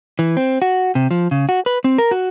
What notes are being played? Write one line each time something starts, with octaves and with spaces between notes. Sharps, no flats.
E3
C4
F#4
C3
F3
C#3
F#4
B4
C4
A#4
F#4